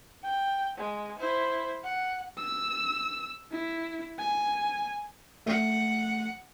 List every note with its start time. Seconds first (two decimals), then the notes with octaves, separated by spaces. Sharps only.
0.23 G5
0.78 G#3
1.19 E4 C5
1.83 F#5
2.38 E6
3.51 E4
4.19 G#5
5.46 A3 F#5